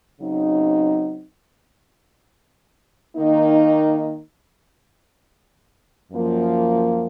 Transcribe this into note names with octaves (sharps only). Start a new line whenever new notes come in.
C#3 F#3 C4 D#4
D#3 A#3 D#4
F#2 F3 A#3